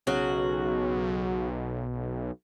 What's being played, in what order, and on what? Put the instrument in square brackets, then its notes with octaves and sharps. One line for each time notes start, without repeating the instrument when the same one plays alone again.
[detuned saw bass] B1 [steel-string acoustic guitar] C#3 F#3 F#4